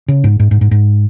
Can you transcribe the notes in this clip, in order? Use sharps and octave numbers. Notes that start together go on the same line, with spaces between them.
C#3
G#2
G#2
G#2
G#2
G#2